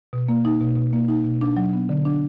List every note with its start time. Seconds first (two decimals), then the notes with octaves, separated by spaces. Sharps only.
0.13 B2
0.28 A#3
0.45 D#4
0.60 B2
0.77 B2
0.93 A#3
1.08 D#4
1.24 B2
1.41 D4
1.57 F#3
1.73 B3
1.89 D3
2.05 D4